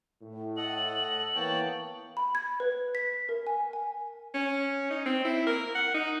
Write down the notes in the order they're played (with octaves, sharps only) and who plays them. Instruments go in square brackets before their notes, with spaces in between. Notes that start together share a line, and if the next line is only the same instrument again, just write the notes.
[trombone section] A2
[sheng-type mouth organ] A4 D#5 F#5 [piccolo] F#7
[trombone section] E3 A#3 B3 [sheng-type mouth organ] C#5 G5 A5
[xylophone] B5
G#6
B4
B6
A#4
G#5
G#5
[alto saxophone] C#4
D#4
C4
E4
A#4
F#5
D#4